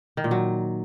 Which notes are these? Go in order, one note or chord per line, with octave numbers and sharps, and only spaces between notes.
D#3
A#2
F#3